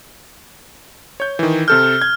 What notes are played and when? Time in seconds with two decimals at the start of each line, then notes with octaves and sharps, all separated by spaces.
1.20 C#5 G6
1.39 D#3 E3
1.68 C3 A4 F6 G6
2.02 G#6